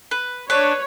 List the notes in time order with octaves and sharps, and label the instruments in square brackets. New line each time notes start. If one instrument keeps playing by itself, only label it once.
[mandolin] B4
[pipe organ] D4 [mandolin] B4 [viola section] C#5